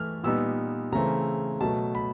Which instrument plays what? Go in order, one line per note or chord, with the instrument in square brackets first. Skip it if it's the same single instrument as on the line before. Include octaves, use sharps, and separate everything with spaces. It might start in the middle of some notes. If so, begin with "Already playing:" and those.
Already playing: [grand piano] E3 A3 F6
A#2 G3 B3 D#4 E6
C#3 E3 A3 C4 A#5
B2 F#3 A3 A5
B5